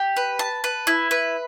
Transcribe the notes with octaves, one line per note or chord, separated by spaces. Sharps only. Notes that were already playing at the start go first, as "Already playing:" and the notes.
Already playing: G4
B4
A5
B4
E4
B4